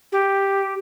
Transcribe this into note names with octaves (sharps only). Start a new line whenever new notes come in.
G4